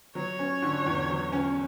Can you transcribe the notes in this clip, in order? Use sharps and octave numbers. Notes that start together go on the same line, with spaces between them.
F#3 C#5
C#4
D3
E2
F#3
C#4